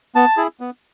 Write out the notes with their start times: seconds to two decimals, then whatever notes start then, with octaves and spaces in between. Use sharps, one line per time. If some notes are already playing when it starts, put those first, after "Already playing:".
0.15 B3 A5
0.37 E4 G#4
0.60 B3